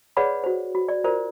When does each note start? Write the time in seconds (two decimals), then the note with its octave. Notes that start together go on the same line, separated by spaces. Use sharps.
0.17 G#4 B4 C#5 D5 F#5 B5
0.44 F#4 C5
0.75 F#4
0.89 D5
1.04 F4 A#4 C5 D5